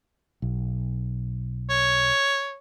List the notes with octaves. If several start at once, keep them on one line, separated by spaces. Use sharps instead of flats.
B1
C#5